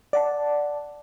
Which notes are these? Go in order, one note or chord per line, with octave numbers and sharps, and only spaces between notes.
D5 F#5 A5